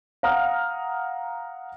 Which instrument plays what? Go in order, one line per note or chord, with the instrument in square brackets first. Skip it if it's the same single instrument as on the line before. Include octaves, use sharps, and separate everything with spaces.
[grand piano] F5 F#5 A#5 D#6 F6